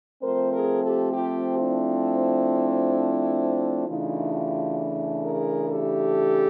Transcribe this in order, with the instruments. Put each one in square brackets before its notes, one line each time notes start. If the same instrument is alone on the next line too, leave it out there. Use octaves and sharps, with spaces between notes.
[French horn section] F3 A3 C4 A#4 C5
G#4 A#4
G4 A4
F4 G4
D4 E4
C#3 E3 A3 D4 D#4 F4
F4 G4
G#4 A#4
G4 A4